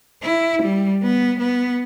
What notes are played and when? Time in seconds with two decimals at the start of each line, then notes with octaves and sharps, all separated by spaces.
0.23 E4
0.62 G3
1.03 B3
1.39 B3